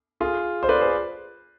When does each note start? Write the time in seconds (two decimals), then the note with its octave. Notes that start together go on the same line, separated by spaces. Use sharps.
0.20 F4 G#4
0.63 C5
0.69 B4 D5
0.81 G#4 C5